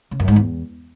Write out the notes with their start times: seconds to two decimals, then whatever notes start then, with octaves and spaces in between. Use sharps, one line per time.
0.11 C#3
0.20 F#2
0.28 G#2
0.36 E2